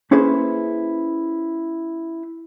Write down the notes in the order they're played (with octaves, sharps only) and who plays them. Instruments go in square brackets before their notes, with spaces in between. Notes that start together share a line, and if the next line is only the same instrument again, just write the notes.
[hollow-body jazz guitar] A#3 C#4 E4 G#4 B4 C5